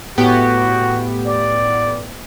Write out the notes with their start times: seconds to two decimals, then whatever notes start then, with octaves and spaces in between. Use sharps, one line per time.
0.18 A2 B3 F#4 G4
1.27 D5